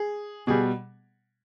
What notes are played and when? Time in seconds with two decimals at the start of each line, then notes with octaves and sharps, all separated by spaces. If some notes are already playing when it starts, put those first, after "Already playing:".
Already playing: G#4
0.47 B2 G3 G#4